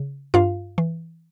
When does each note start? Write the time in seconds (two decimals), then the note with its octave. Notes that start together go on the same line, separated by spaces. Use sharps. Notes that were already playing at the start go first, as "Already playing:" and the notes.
Already playing: C#3
0.34 G2 F4 F5
0.78 E3